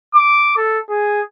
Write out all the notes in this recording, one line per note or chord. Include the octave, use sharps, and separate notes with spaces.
D6
A4
G#4